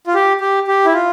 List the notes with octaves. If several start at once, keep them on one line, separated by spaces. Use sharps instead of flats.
F4
G4
G4
G4
E4
F4